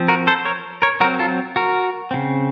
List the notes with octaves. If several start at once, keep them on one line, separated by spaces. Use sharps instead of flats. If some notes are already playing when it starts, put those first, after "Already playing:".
Already playing: F3 C4
F#4 A#4
A4 C5
A#4 C#5
A#4 C#5
F#3 C4 F#4 A#4
F4 A4
F#4 A#4
C#3 F3 C4